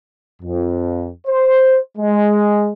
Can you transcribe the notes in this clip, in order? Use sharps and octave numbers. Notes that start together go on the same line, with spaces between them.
F2
C5
G#3